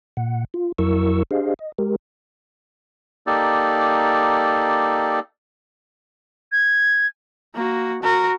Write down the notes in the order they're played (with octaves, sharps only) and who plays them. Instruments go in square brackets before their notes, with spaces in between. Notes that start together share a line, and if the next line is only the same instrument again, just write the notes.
[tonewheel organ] A#2 F#5
F4
F2 F#3 E4 A#4 C#6 E6
D4 G4 G#4 C5 D#5 F5
D#5
G#3 G4 A#4
[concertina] A#3 D#4 G4 A4 D5
[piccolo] G#6
[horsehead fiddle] A#3 F#4
F#4 A#4